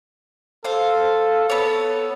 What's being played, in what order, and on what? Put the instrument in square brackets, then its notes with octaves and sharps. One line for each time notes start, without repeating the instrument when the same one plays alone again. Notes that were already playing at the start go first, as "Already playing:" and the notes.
[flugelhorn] A4 [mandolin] C5 F5
[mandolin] B3 C#5 [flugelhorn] A4